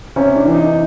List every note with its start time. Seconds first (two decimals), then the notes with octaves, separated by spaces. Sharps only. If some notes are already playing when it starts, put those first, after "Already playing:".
0.16 C3 C#4
0.35 D4
0.45 E3
0.54 D#4